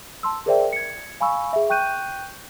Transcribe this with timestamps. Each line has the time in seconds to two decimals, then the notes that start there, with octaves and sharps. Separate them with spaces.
0.23 A5 C6 E6
0.46 G#4 A#4 C5 D5 E5 G5
0.73 G#6 C#7
1.20 F5 G#5 B5 C#6 E6
1.53 G#4 E5
1.70 G5 C#6 F#6 G6 D#7